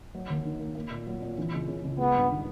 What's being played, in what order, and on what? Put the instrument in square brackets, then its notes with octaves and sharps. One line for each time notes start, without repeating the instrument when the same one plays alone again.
[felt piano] F#3
D#2
D#3
A#3
A#3
A#2
F#3
A#2
E3
C#2
C#3
C#2
[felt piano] G#3 [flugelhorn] B3
[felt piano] G2
D#3